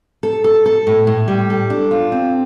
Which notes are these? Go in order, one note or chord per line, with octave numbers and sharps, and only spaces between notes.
A4
A4
A4
A2
A2
G3
A4
D4
F4
C4